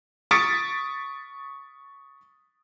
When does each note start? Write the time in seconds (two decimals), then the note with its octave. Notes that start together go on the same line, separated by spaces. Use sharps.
0.31 C#6 D#6 A6 B6 C#7 D7